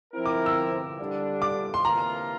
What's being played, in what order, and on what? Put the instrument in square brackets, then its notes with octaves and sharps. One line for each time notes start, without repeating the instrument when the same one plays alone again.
[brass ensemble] F3 C4 E4 A#4
[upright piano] D6
E6
[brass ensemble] D3 G3 D4
[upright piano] D6
C6
[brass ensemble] C3 E3 A#3 D4 F4 [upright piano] A#5